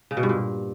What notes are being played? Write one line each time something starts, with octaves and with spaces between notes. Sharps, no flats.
C#3
B2
G2
A#2